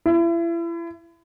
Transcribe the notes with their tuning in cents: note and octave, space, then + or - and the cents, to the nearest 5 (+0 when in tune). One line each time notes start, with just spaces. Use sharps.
E4 +35